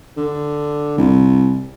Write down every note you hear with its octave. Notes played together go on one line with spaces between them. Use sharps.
D3
C2